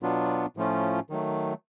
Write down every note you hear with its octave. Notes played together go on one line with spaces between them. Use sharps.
B2 F#3 B3 D4 F4
A2 F3 A3 C#4 F4
D#3 F#3 A3